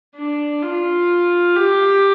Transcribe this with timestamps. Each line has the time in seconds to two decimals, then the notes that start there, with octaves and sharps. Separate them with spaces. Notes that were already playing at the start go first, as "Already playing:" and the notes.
0.16 D4
0.62 F4
1.56 G4